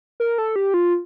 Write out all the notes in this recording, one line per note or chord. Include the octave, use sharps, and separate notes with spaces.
A#4
A4
G4
F4